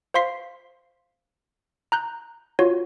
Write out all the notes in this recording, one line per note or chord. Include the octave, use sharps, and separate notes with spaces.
C5 F5 C6 B6 C7
A#5 F#6 G6
F4 F#4 C#5